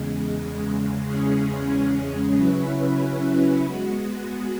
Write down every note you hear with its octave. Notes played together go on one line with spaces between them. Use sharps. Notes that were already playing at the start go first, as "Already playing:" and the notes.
Already playing: E2 C#3 G#3
E2 C#3 G#3 C#4 G#4
C#3 F#3 C#4 E4 B4
G#3 B3 F#4